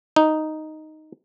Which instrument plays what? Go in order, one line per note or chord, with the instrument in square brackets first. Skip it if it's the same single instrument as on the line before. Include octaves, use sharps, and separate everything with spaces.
[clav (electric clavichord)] D#4